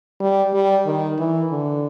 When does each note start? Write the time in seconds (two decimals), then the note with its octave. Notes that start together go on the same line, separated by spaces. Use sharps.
0.20 G3
0.53 G3
0.86 D#3
1.19 E3
1.51 D3